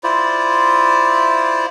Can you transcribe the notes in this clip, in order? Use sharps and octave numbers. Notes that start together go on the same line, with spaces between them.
E4 F4 C5 D5